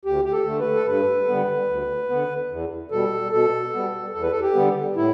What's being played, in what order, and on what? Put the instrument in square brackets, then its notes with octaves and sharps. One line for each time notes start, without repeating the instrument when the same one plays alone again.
[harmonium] D2 G4
G4
A4
D3 A3
B4
A4
G2 B4
D3 G3 B3
D2
D3 B3
E2
B2 G3 A4
B2 A4
G3 B3
E2 A4
B4
A4
G4
D3 G3 B3
A2 E4